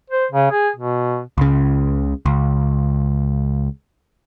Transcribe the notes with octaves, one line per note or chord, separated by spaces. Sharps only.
C5
C#3
G#4
B2
C#2 C#3
C#2